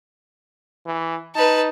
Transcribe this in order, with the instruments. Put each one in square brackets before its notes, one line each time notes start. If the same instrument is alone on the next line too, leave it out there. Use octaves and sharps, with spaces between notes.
[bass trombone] E3
[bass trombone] D#4 [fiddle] B4 A5